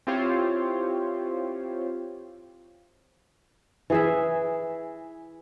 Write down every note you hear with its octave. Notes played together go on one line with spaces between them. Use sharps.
C4 E4 F4 G4 C5 C#5
E3 G#4 E5